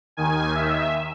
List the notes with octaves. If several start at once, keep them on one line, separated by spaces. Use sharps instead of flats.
D#2 D#3 G#5
E5